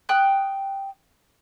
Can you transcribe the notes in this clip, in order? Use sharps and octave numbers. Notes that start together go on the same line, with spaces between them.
G5 D#6 F#6